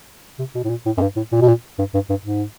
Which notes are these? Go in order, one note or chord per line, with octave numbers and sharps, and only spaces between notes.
C3
B2
A2
A#2
A2
F#2
G2
A2
A#2
B2
A#2
G2
G2
G2
G#2